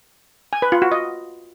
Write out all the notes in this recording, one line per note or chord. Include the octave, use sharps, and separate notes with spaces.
G#5
B4
F4
F#4
D#5